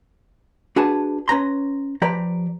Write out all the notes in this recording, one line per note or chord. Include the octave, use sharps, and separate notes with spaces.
D4 F#4 G#4 B4 A5
C#4 B4 A#5 C6
F3 G4 B4 D5 A#5